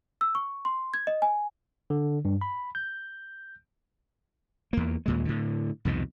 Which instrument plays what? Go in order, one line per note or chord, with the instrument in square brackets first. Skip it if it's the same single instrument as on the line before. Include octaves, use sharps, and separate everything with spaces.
[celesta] E6
C#6
C6
G#6
D#5
G#5
[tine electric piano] D3
G2
B5
G6
[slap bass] E2 A#3
D#2 A#2 G#3
A2 D3
C2 F2 B2 D#3